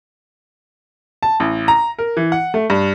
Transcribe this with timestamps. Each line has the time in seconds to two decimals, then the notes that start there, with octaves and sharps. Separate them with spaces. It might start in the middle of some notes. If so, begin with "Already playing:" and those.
1.23 A5
1.40 A1
1.68 A#5
1.99 A#4
2.17 E3
2.32 F#5
2.54 A3
2.70 G2